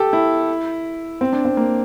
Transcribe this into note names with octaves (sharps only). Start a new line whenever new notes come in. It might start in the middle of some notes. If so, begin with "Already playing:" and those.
Already playing: G4 A4
E4
C4
D4
C4
A#3